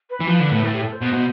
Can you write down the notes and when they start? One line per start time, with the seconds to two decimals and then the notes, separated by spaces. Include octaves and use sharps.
0.10 B4
0.20 E3
0.27 F3
0.40 D3
0.52 A2
0.64 A2 A4
0.74 G4
0.82 A4
0.92 C5
1.02 B2
1.13 B2